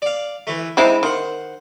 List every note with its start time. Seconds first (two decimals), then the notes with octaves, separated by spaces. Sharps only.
0.02 D5 F5
0.47 E3 A3
0.77 G#3 C4 D#4 E4 A5 D6
1.03 D#3 C5 F#5